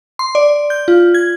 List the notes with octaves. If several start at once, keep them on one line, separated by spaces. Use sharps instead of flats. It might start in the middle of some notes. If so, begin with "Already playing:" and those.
C6
D5
G6
F4
G#6